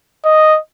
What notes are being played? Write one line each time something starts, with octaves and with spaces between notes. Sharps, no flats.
D#5